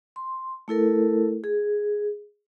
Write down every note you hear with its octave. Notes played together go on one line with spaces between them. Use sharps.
C6
A3 E4 A4 A#4
G#4